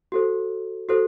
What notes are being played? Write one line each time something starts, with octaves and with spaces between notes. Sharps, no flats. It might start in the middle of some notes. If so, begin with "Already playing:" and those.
F#4 A4 C5
F#4 A4 C5